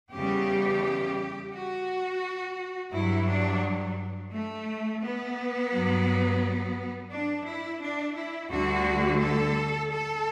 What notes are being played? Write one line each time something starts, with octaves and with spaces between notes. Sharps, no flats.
E2 C#3 G3 G4
F#4
G2 F#3 E4
D4
A3
B3
G2 F#3
D4
E4
D4
E4
D2 D3 G3 F#4
A4
A4